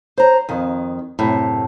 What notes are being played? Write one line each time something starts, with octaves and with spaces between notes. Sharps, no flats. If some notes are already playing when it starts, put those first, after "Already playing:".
C5 A#5
F2 D#3
F#2 A2 C3